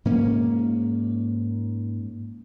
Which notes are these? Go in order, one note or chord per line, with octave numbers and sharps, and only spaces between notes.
G#2 F#3 A#3 C#4